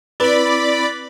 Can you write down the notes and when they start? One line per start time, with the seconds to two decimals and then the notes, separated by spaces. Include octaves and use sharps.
0.20 C4 E4 B4 D5 B5